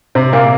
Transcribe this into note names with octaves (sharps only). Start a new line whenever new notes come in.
C3 C4
A#2 A#3